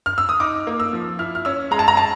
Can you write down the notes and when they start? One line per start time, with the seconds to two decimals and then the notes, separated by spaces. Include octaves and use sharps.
0.06 F6
0.18 E6
0.29 D#6
0.40 D#4 D6
0.67 A#3
0.80 E6
0.93 F3
1.19 E4 F6
1.35 F6
1.45 C#4 E6
1.71 G#3 A#5
1.79 A5
1.88 A#5
1.97 A5